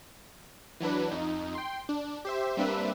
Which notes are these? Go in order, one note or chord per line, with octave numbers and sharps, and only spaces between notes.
E3 F#3 D4 B4
F2 D#4
G5 C6
D4
G4 C5 E5
G3 A#3 C4 D4 B4 E5